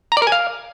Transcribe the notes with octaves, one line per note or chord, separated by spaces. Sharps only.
A#5
D5
A#4
G#5
F5